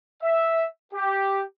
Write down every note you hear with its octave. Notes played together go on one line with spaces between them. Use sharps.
E5
G4